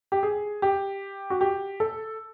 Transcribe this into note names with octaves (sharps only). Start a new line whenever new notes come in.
G4
G#4
G4
F#4
G4
A4